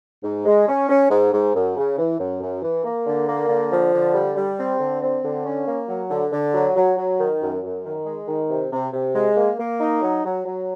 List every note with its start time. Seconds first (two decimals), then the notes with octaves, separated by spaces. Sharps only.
0.23 G#2
0.45 G#3
0.68 C#4
0.89 C#4
1.10 G#2
1.33 G#2
1.55 F#2
1.76 C#3
1.98 E3
2.19 F#2
2.41 F#2
2.62 E3
2.84 A#3
3.07 D3
3.28 A#3
3.49 D3
3.72 F3
3.93 D3
4.14 G3
4.36 G3
4.59 C4
4.80 D3
5.02 C4
5.24 D3
5.46 C#4
5.68 A#3
5.88 F#3
6.11 D3
6.32 D3
6.54 F#3
6.76 F#3
6.97 F#3
7.20 D#3
7.41 F#2
7.63 F#2
7.85 D#3
8.06 G#3
8.28 D#3
8.50 C3
8.72 C3
8.93 C3
9.15 G#3
9.37 A#3
9.59 A#3
9.80 D#4
10.02 F#3
10.24 F#3
10.45 F#3